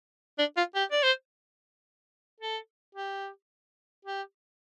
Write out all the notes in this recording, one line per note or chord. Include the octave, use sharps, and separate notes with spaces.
D4
F4
G4
D5
C5
A4
G4
G4